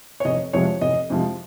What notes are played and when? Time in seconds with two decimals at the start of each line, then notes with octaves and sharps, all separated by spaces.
0.20 C#5
0.25 F1 D#5
0.53 F2 C3 F3 G#3 C#5
0.81 F1 D#5
1.10 F2 C3 F3 G#3